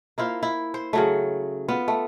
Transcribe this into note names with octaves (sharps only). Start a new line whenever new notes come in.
A#3 E4 F4 C5
E4
C5
C#3 F#3 A3
B3 F4
A3